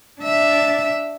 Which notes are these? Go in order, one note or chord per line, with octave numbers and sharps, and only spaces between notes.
D4 E5